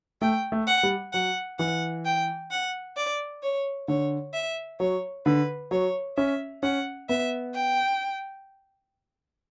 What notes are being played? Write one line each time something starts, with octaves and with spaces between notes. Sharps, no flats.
A3 G5
A3
F#5
G3
F#3 F#5
E3 F#5
G5
F#5
D5
C#5
D3 C#5
E5
F#3 C#5
D3 B4
F#3 C#5
C#4 E5
C#4 F#5
B3 E5
G5